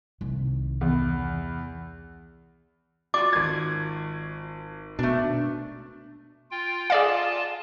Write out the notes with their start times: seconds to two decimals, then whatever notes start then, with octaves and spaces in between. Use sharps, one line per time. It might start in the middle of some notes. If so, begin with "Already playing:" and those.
0.21 C2 D#3
0.81 E2
3.14 F4 F#4 D5 D6
3.33 G#1 G#6
4.99 B2 A3 D4
6.51 F4 G5
6.90 F4 G#4 D5 F5 A5